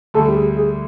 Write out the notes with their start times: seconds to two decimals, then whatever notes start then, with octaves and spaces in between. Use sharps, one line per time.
0.14 D2 D3 G3 A4
0.28 G4
0.35 G#4
0.57 G#4